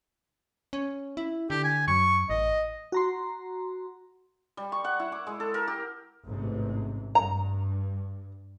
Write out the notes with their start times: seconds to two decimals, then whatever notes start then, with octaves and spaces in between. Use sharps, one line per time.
0.73 C#4
1.17 E4
1.50 D3 G4
1.64 G#5
1.88 F#2 C#6
2.30 A1 D#5
2.92 F#4 A#5 C6
4.57 G3
4.72 C#6
4.84 F#5
5.00 E4
5.12 D6
5.27 G#3
5.40 A4
5.54 A#4
5.68 G4
6.26 A1 G#2 C3
7.15 G2 A#5